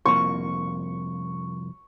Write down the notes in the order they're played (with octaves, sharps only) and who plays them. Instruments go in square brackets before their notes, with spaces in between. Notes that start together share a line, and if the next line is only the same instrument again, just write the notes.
[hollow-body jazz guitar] C2 F2 A#3 [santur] C#6